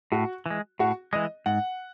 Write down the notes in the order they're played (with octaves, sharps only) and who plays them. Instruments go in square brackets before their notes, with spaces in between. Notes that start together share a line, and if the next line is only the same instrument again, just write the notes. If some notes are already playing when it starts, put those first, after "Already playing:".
[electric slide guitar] A2 [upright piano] F#4
[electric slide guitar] E3 G#3
[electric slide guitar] A2 [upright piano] F#4
[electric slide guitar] E3 G#3 [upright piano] D#5
[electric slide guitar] G#2 [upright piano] F#5